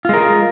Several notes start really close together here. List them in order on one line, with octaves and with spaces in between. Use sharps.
F4 G#3 A#4